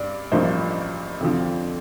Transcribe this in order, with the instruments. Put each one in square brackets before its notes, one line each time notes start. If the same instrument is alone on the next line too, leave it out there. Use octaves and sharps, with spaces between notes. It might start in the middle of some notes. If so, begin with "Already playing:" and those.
Already playing: [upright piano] G2 D5
A1 G2 F3 A#3 C5
F2 D3 F3